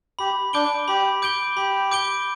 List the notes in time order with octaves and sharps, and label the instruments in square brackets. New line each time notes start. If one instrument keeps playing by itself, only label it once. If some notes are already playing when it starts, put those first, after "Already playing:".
[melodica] G4 [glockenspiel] B5
[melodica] D4 [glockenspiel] D6 G6 D7 G7
[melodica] G4 [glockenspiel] B5
[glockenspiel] D6 G6 D7 G7
[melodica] G4 [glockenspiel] B5
[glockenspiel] D6 G6 D7 G7